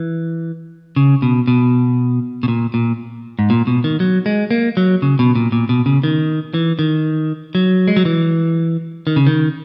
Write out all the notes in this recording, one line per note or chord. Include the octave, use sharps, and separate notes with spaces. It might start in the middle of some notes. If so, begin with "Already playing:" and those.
Already playing: E3
C#3
B2
B2
B2
A#2
A#2
G#2
A#2
B2
D#3
F#3
G#3
A#3
F#3
C#3
B2
A#2
A#2
B2
C#3
D#3
E3
D#3
F#3
G#3
F#3
E3
D#3
C#3
D#3